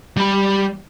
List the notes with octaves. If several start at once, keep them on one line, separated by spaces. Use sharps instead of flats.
G3 B5